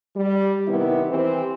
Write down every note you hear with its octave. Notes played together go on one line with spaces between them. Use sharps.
G3
C3 D#3 B3 E4
E3 C4 G4 C5